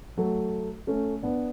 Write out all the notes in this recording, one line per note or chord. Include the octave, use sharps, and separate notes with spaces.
F#3 A3
A3 C#4
B3 D4